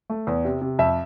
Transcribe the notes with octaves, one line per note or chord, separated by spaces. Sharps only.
A3
E2
C3
C3
F2 E5